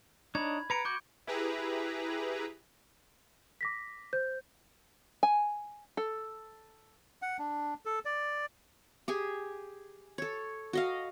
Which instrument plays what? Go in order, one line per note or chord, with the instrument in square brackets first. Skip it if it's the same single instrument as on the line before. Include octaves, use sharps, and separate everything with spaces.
[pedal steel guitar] D4 D#4 C#5 [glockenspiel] B5 G#6
[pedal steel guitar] B4 A#5 [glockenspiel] G#6 C#7 D7
[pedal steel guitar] F#4 [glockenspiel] C#6 D6 G6
[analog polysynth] E4 G4 G#4 B4 A#5
[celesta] D6 A#6 B6
C5 G6
[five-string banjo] G#5
A4
[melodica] F#5
D4
A4
D5
[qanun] G4 G#4 G#5
A4 C#5
F#4 D#5 F5